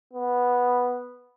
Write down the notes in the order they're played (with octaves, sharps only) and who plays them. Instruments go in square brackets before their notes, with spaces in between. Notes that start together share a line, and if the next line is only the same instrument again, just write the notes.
[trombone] B3